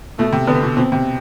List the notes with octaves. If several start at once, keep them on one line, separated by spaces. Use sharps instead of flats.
B2 A3
C3
D3 B3
B2
B2 C4
C3